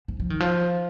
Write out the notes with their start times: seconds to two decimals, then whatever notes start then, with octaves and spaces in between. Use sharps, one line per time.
0.08 F3
0.20 F3
0.30 D#3
0.40 F3